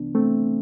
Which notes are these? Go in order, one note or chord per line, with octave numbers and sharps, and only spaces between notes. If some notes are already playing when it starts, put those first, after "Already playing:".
Already playing: C2 C3 E3 B3 D4
A3 C4